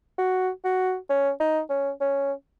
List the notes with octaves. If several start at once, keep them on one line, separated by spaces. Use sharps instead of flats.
F#4
F#4
C#4
D#4
C#4
C#4